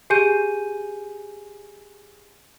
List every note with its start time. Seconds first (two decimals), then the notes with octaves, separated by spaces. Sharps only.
0.10 G4 G#4 G#5 G6 D#7